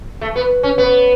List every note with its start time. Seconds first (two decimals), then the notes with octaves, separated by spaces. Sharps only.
0.21 A3
0.36 B3
0.63 C#4
0.78 B3